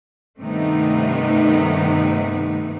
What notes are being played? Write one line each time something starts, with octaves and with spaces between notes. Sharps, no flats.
G2 C3 D#3 A3 B3 D#4